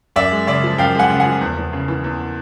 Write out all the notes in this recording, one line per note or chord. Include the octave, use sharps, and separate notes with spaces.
F#2 D5 E5
G#3
C#3 D5 E5
F3
F#2 F5 G5
G#3 F#5 G#5
C#3
F#5 G#5
F3
E2
E2
C#3
E3
E2